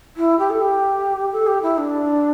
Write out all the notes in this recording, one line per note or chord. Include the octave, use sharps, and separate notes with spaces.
E4
G4
A4
G4
A4
G4
E4
D4